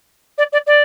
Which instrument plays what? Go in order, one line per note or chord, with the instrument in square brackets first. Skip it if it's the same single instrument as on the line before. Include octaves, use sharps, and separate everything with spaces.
[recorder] D5
D5
D5